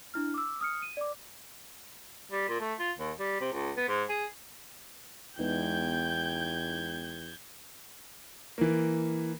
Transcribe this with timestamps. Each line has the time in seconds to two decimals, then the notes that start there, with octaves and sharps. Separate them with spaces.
0.14 D4 E4 F6
0.34 D6 E6
0.61 D#6 F6 C#7
0.82 D#7
0.97 D5 D6
2.32 G3
2.49 A#2
2.60 A3
2.79 F4
2.98 D#2
3.19 G3
3.41 C3
3.52 C#2
3.77 B3
3.88 G#2
4.09 G#4
5.39 E2 G#3 B3 D#4 G5 G6 G#6
8.58 E3 A#3